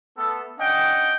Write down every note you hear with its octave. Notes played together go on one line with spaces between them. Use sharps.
A3 B3 A4
C#4 D4 D#5 F#5 G5